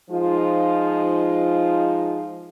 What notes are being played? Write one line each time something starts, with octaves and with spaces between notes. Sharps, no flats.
F3 G#3 D#4 F4